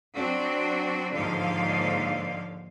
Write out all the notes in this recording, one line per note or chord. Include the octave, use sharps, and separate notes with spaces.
F#3 C4 D4 F#4
D#2 G#2 D3 F3 F5